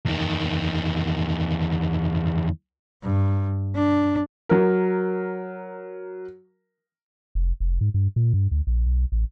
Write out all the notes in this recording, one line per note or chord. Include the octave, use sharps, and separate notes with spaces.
E2 D#3
G2
D4
F#3 A#4
F1
F1
G#2
G2
A#2
G2
D2
A#1
B1
A1